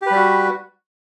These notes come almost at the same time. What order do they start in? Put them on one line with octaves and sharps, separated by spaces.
G4 B4 G3 F#4